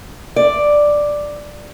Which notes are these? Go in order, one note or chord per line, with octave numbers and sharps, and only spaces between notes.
D5